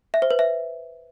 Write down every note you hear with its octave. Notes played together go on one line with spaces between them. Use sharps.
E5
C5
B4
E5